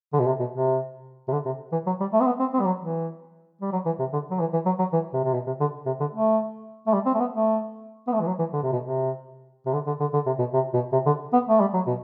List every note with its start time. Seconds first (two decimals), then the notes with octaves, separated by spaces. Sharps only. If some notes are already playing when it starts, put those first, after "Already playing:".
0.13 D3
0.19 B2
0.26 C3
0.39 B2
0.53 C3
1.28 C3
1.32 D3
1.46 C3
1.72 E3
1.87 F#3
2.00 G3
2.13 A3
2.20 C4
2.26 B3
2.40 C4
2.53 C4
2.60 G3
2.66 F#3
2.80 E3
3.62 G3
3.72 F#3
3.86 E3
3.99 C3
4.13 D3
4.31 F#3
4.40 E3
4.53 E3
4.66 F#3
4.79 F#3
4.93 E3
5.13 C3
5.24 C3
5.33 B2
5.47 C3
5.60 D3
5.86 C3
6.00 D3
6.13 A3
6.87 A3
6.93 G3
7.06 C4
7.14 A3
7.19 B3
7.33 A3
8.07 B3
8.12 A3
8.20 E3
8.27 F#3
8.39 E3
8.53 D3
8.63 C3
8.72 B2
8.83 C3
9.66 C3
9.73 D3
9.87 D3
10.00 D3
10.13 D3
10.26 C3
10.39 B2
10.53 C3
10.73 B2
10.92 C3
11.06 D3
11.33 B3
11.49 A3
11.60 G3
11.73 F#3
11.87 B2